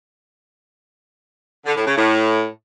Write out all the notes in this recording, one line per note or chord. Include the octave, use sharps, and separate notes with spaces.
D3
A2
C#3
A2